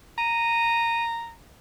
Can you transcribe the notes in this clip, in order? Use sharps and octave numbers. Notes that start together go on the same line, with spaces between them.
A#5 D#7